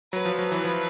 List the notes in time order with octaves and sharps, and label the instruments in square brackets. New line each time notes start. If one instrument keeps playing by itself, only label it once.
[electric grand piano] F#3 [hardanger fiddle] B4
[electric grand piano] F3
F#3
E3
F3